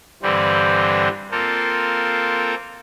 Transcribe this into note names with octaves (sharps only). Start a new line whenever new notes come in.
G2 D3 E3 G3 C4
A#3 C4 F4 A4 A#4